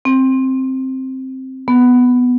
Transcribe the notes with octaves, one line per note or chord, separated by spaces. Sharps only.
C4
B3